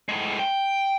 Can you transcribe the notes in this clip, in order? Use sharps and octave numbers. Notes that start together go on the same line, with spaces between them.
A2 G#3
G5